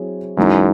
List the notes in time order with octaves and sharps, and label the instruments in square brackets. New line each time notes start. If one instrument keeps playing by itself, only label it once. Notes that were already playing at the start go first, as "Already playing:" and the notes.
Already playing: [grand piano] F#3 C4 E4 G#4 C#5
[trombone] F#2 [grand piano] E3 G#3 D#4